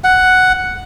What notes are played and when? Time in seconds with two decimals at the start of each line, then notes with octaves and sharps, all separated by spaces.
0.04 F#5